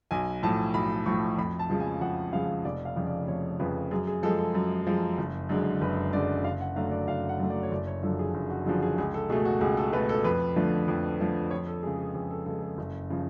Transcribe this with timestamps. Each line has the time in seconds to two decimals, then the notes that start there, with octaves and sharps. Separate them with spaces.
0.11 B1 G#5
0.43 A2 F3 A5
0.74 B1 B5
1.06 A2 F3 C#6
1.38 F2 B5
1.59 A5
1.70 C#3 F3 G#3
1.80 G#5
2.01 F2 F#5
2.33 C#3 F3 G#3 F5
2.65 F1 D5
2.85 F5
2.96 F2 C#3 F3
3.06 D5
3.28 F1 C#5
3.60 F2 C#3 F3 B4
3.91 F#2 G#4
4.07 G#4
4.23 F3 G#3 A4
4.39 A4
4.55 F#2
4.86 F3 G#3
5.18 F#1
5.49 F#2 D3 G#3
5.81 F#1 B4
6.13 F#2 D3 G#3 D5
6.44 F#1 F5
6.61 F#5
6.76 F#2 D3 F#3 A3 F5
6.91 D5
7.08 F#1 F5
7.29 F#5
7.40 F#2 D3 F#3 A3
7.50 D5
7.63 C#5
7.71 F#1 D5
7.87 C#5
8.03 F#2 D3 F3 A4
8.19 G#4
8.34 F#1
8.50 F#4
8.66 F#2 D3 F3 G#4
8.82 G#4
8.98 C#2 G#4
9.14 A4
9.29 B2 G#4
9.32 A3
9.45 F#4
9.61 C#2 G#4
9.77 A4
9.92 B2 A3 B4
10.09 A4
10.24 F2 B4
10.56 D3 F3 A3
10.88 F2
11.19 D3 F3 A3
11.51 F2 C#5
11.67 A4
11.83 C#3 G#3 G#4
11.99 G#4
12.15 F2 G#4
12.31 A4
12.46 C#3 A4
12.49 G#3
12.62 A4
12.78 F#1
13.10 C#3 F3